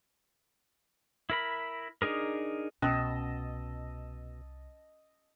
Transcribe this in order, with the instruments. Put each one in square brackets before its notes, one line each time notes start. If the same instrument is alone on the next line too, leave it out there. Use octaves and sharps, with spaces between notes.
[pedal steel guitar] E4 A#4 B5
D4 D#4 G#4 A#4
[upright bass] C2 [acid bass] B2 [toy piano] C#4 [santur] D#5 A5 E6